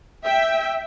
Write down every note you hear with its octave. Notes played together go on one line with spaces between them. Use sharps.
E5 G5